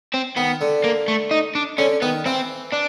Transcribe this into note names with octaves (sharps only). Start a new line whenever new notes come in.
C4
D#3 B3
D3
A#3
A3
D#4
D4
D3 C#4
D#3 B3
E3 C4
D4